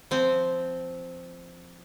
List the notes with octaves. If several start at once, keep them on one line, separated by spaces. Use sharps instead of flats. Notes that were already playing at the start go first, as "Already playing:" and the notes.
F3 C4